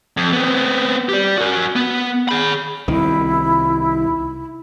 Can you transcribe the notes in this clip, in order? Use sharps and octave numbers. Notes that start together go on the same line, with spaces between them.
F2
B3 C4
G4 D5
F#4 A#4
B3
G#4 B5
C2 D#3 E4